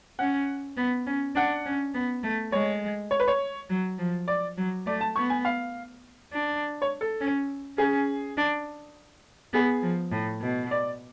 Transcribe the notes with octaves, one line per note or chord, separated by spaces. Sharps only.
C#4 F#5
B3
C#4
D4 F#5
C#4
B3
A3
G#3 C#5
C#5
B4
C#5
F#3
F3
D5
F#3
A3 D5
A5
B3 C#6
G#5
F5
D4
C#5
A4
C#4
C#4 G#4
D4
B3 G#4
F3
A2
B2
D5